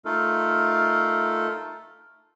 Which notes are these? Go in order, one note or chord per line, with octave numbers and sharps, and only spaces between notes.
A3 D#4 F4 A4 A#4